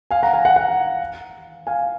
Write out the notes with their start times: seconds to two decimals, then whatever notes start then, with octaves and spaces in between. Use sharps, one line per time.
0.11 F5 G#5
0.22 F#5 A#5
0.33 F5 G#5
0.45 F#5
0.56 F#5
1.67 F5 G#5